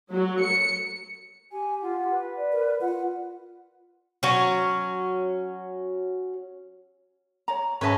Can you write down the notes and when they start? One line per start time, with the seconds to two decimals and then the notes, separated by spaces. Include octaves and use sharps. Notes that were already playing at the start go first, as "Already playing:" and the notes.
0.12 F#3
0.44 C#7
1.52 G4 G#5
1.82 F4 F#5
2.11 B4
2.37 D5
2.52 A#4
2.81 F4 F#5
4.23 F#3 C#4
7.48 C#5 A#5
7.81 G#2 C#4 B4 C5 D#5 E5 A5